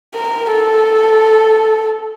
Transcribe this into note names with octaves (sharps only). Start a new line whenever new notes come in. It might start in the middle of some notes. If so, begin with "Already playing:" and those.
A#4
A4